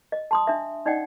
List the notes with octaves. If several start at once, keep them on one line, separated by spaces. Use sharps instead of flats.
D#5
A5 C6 D#6
D4 E5
C#4 D#4 D5 D#5 F#5 G5